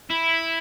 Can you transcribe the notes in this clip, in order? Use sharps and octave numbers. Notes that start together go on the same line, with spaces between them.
E4